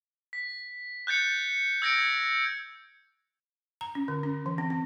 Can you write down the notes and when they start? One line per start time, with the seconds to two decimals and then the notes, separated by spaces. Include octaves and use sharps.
0.33 B6
1.07 F#6 G6 A6 C#7
1.82 E6 G#6 A#6 C#7 D7
3.81 A#5
3.95 C#4
4.08 D3
4.23 C#4
4.46 E3
4.58 C4
4.70 C4